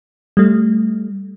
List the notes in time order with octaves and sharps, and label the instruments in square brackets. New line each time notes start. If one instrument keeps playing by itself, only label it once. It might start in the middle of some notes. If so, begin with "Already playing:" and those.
[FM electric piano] G3 A3